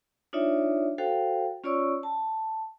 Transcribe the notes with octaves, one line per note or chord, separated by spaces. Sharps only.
D4 D#4 F4 C#5 D5 E5
F#4 A4 C5 F5 G5
C#4 F4 C#5 D5 C#6 E6
A5